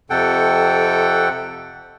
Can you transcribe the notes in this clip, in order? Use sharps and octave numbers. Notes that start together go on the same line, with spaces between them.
F2 C3 A4 F#5 G5